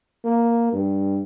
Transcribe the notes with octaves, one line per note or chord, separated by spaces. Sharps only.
A#3
G2